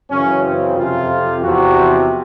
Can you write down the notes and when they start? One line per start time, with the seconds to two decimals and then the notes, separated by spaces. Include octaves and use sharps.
0.11 F#2 C#3 E3 C#4
0.44 C4
0.77 F2 C3 F3 F4
1.42 E2 C3 F3 F#4